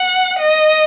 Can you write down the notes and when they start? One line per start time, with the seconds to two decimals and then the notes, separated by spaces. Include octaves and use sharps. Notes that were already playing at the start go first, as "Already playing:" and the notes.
Already playing: F#5
0.39 D#5